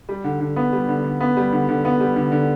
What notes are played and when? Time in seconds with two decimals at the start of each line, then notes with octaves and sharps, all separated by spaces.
0.09 G3
0.24 D3
0.41 D3
0.56 B3
0.73 G3
0.89 D3
1.04 D3
1.21 B3
1.37 G3
1.53 D3
1.69 D3
1.85 B3
2.00 G3
2.16 D3
2.32 D3